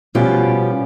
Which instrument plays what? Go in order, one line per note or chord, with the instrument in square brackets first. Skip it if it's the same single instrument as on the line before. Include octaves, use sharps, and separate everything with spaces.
[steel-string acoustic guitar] B2 F3 G3 C#4 F4 G4